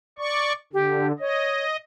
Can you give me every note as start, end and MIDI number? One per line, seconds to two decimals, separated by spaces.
0.18 0.53 74
0.18 0.53 85
0.73 1.12 50
0.73 1.06 67
1.19 1.64 73
1.19 1.77 75